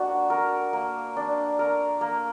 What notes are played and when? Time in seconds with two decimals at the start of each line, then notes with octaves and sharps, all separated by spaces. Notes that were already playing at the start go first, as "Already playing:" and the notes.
Already playing: A#3 D4 F#4
0.30 A#4
0.73 A#3
1.16 D4
1.59 A#4
2.01 A#3